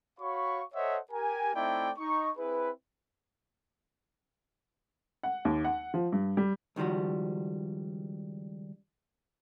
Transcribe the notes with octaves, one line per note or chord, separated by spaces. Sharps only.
F#4 C#5 F5 B5 C#6
A4 C5 C#5 D#5 E5 F#5
G4 A#4 G#5
A3 C4 D#4 E4 D5 G5
D#4 C#6
C4 E4 G#4 B4
F#5
D#2
F#5
F3
G2
G3
C#2 D#3 F3 G3 F#4